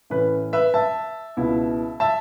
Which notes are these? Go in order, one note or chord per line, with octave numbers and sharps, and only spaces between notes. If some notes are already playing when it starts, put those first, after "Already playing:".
A2 E3 C#4 B4
B4 E5
E5 A5
C#2 B2 B3 E4
E5 A5